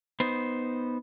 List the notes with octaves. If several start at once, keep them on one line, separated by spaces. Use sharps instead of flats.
B3 D#4 C5